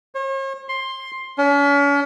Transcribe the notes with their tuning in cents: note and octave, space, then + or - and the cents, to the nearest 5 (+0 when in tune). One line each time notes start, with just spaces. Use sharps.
C#5 -45
C6 +10
C#4 +40